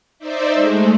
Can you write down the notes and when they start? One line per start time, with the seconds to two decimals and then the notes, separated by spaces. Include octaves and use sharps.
0.19 D#4 C5 D5 E5
0.54 G#3 A3